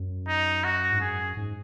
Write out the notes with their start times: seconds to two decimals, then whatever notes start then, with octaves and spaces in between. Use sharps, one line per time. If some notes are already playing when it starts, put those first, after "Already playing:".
Already playing: F#2
0.28 D#4
0.64 F#4
0.92 G#2
1.00 F#2 G#4
1.37 G#2